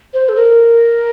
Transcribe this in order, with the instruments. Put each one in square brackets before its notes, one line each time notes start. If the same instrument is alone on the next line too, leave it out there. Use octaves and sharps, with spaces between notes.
[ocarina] C5
A4
A#4